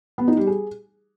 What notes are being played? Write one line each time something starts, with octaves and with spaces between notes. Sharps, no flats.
B3
D#4
G3
G#4